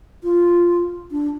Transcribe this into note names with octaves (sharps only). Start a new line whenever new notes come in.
F4
D4